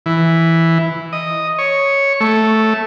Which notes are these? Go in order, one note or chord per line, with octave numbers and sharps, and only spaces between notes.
E3
D#5
C#5
A3